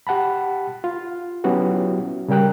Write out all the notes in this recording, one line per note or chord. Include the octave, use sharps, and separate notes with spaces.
G4 F#5 A5 B5
F4
F#3 B3 C#4 E4 F#4 G4
C#3 G3 A#4 G5 F#6